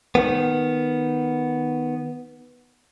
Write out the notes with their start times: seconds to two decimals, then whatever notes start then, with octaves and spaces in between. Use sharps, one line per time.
0.15 D#3 B3